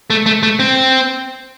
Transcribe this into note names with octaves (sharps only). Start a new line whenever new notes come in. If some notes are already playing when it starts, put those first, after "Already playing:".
A3
A3
A3
C4